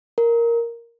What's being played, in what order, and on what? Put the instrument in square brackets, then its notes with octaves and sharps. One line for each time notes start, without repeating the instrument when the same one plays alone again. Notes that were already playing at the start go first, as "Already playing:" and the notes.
[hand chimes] A#4